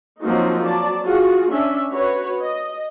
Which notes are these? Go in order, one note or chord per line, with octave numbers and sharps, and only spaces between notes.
F3 F#3 A#3 C4 D#4 F#4
F#3 D5 A5
F4 F#4 G#4
C#4 D4 E5
F#4 B4 C#5
D#5